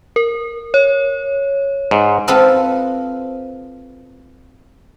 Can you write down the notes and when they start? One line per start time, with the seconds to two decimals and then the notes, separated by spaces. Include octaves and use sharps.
0.16 A#4
0.74 C#5
1.91 G#2
2.28 C4 F4 A4 B4 D#5